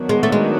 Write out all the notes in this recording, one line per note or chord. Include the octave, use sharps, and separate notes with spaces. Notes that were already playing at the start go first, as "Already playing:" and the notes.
Already playing: D#3 F#3 B3 D4 F#4
G#3
A3
G#3